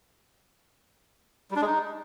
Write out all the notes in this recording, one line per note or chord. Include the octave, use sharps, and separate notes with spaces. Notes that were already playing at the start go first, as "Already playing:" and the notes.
G3
D4
G#3
D#4